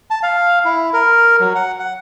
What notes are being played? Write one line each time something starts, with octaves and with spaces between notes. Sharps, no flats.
A5
F5
E4
A#4
F#3
F#5
F#5